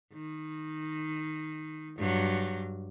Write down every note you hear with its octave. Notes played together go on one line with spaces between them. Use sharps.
D#3
G2 F#3